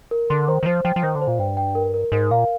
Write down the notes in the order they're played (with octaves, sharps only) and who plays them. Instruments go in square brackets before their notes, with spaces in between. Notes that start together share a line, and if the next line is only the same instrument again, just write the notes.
[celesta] A#4
[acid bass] D3 [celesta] C6
[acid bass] D#3 [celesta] C5
[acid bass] D#3
[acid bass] F3 [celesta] C5
[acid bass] F3 [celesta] G5
[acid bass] F3
[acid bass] D#3 [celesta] C5
[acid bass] D3
[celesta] C5
[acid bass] A#2
[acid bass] G2 [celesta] G5
[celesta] G5
A#4
A#4
[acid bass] G#2 [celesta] A#4
[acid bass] A#2 [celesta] F5